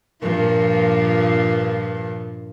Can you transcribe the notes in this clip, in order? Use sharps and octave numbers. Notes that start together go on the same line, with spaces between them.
G2 A#2 F3